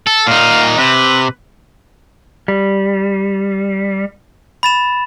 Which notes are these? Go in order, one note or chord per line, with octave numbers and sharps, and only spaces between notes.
A4
A#2 D#4 F5
C3 B4
G3
B5 A6 E7